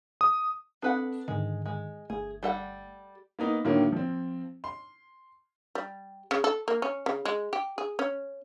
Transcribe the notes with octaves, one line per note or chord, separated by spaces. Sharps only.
D#6
C4 D4 A4 B4 F#5 D#6
G#2 D3 D#3 G#3
G#3
G1 A3 G#4
G3 A4 F#5
A#3 B3 D#4
A2 D3 D#3 F#3 A#3
F3 C4
C6
G3
C#3
A4
A#3
C#4
C#3
G#3
G4
G#4
C#4